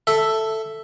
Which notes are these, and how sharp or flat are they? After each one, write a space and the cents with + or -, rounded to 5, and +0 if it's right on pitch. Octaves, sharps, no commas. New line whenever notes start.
A4 +5 E5 +0